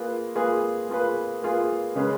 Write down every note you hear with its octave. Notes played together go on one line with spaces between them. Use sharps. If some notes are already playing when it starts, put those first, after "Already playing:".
Already playing: A#3 F4 G#4 B4
A#3 F4 G#4 B4
A#3 F4 G#4 B4
A#3 F4 G#4 B4
C#3 G#3 C#4 G#4 B4